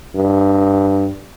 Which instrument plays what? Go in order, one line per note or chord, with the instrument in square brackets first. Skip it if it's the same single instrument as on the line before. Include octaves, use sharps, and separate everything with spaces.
[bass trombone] G2